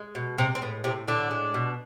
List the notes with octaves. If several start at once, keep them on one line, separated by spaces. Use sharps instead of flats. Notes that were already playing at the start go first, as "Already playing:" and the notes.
Already playing: G#3
B2
C3 G#3 C4
C4
A2 B3
A2 C3 C4
A2 D3 D4
G#3
B2